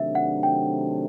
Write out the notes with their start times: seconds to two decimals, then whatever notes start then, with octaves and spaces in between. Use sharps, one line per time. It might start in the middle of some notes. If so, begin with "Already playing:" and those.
Already playing: C3 D#3 F#3 A3 D4 E5
0.15 F#5
0.43 G5